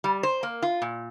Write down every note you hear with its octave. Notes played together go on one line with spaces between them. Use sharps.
G3
C5
A#3
F4
A#2